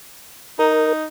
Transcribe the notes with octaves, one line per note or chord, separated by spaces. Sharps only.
D#4 A#4